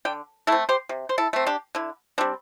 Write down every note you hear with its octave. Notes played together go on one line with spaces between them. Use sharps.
D3 D5 G5
A3 C4 E4 A4
G4 C5
C3
C5
E4 A4
A3 C4
D4 G4
D3 E4
G3 C4 D4